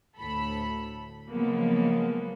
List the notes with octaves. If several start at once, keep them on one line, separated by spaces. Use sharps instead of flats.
D2 A2 A4 B5
C#3 F3 F#3 G#3 A#3 B3